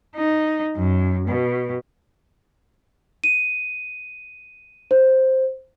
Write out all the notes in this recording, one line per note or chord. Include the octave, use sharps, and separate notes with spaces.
D#4
F#2
B2
D#7
C5